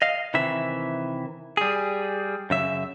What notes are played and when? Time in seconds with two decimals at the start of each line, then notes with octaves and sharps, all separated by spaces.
0.02 D#5 F5
0.34 C3 D#3 E3 E5
1.57 G3 G#4
2.50 F#2 C#3 E5